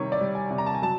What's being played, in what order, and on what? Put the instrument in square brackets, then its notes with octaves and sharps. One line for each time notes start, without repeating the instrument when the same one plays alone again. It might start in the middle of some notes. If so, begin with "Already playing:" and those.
Already playing: [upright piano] C3 D#3 G3 C#5
D5
G3
G#5
C3
A#5
A5
G#5
F#3 A5